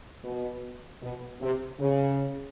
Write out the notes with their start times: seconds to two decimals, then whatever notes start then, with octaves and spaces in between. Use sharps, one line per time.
0.24 B2
1.02 B2
1.41 C3
1.80 C#3